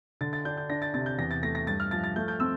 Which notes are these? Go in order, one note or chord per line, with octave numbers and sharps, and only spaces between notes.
D3 A6
A6
D4 G6
G6
D4 A#6
A6
C3 A6
G6
E2 A#6
A6
A3 A#6
A#6
G2 A6
F6
F3 A6
A6
A3 G6
G6
C4 E6